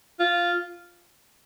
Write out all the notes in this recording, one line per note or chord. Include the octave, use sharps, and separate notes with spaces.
F4